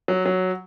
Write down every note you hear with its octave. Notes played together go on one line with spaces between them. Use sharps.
F#3
F#3